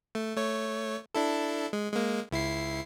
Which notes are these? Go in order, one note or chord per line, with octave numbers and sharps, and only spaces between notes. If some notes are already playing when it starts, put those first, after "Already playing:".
A3
A3 C#5
D4 E4 A4
G#3
G#3 A#3
C#2 E4 C7